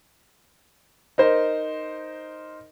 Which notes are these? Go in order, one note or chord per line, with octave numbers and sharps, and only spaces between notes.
D#4 A#4 C5